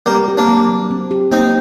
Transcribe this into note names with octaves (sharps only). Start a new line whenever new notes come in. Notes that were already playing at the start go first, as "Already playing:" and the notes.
G3 A#3 C4
G4
A#3 D4
F#3
F#3
C4
G4
A#3 C4 D#4